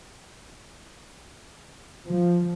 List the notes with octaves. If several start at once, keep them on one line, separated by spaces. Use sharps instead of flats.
F3